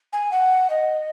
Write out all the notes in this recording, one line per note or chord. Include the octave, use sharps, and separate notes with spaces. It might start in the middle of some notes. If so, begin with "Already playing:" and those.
G#5
F#5
D#5